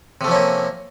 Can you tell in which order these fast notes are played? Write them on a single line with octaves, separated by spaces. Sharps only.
C3 A3 F3 C#4 A#3